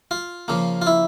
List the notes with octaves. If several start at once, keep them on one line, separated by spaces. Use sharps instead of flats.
F4
C#3 F3 A#3
F4
E4